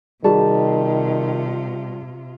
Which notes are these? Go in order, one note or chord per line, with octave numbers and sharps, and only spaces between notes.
C3 D#3 G3 F4 F#4 G#4 D5 A5